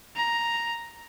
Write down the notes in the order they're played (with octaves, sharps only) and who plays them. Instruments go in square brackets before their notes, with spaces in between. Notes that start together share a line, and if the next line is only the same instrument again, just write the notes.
[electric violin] A#5